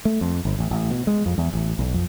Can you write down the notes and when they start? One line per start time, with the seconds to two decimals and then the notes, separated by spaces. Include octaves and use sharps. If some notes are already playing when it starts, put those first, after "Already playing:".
0.05 A3
0.21 F2
0.45 G1
0.59 A1
0.71 A1
0.91 B2
1.07 G#3
1.26 F2
1.38 E2
1.53 A1
1.79 B1
1.94 F2